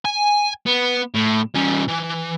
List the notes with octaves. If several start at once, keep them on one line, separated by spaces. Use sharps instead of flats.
G#5
B3
A2
G3 C#4
E3